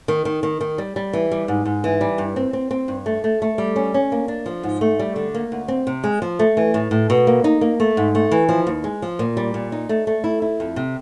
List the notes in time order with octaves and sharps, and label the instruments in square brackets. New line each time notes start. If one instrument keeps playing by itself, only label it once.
[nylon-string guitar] D#3
D#3
D#3
D#3
G3
G3
E3
G3
G#2
G#2
E3
G3
G2
C4
C4
C4
G2
A3
A3
A3
G3
C#4
C#4
A#3
D4
F3
G#2
A3
G3
D3
A#3
D2
C4
C3
G#3
F3
A3
E3
A2
A2
B2
A#3
D#4
A#3
A3
G#2
A3
E3
F3
D#2
G#3
F3
A#2
G3
A#2
D#4
A3
A3
E4
E4
F2
C3